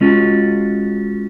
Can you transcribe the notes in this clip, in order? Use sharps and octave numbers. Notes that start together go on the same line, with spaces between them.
G#3 C#4 F4 F#4